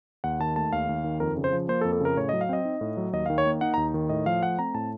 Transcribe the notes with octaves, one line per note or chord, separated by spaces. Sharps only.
D#2 F#5
D#3 A5
A3 A5
D#2 F5
D#2
D#3
F2 A#4
C#3
C5
F3
A#3 C5
A4
F2
A4
C#3 A#4
A2 C#5
F#3 D#5
F5
C4 D#5
D#4
A2
F#3
D#2 D#5
D#3 F5
C#5
A#3
D#4 F#5
D#2 A#5
D#3
A2 D#5
F3 F5
A3 F#5
C4 A#5
A2 A5